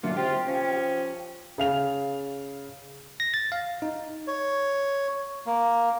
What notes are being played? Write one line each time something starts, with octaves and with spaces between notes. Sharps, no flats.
D3 F#3 A3 A#3 F4
C3 F4 G4
F3 C#4
C#3 F5 F7
A#6
A6
F5
D#4
C#5
A#3